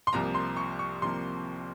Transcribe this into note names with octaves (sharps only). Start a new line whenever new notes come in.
C6
C2 C3 F3 A#3 A#5
C6
C#6
C#6
C2 C3 F3 A#3 C6